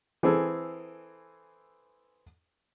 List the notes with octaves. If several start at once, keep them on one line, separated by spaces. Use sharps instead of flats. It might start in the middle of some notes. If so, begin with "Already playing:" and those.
E3 C4 G#4 A4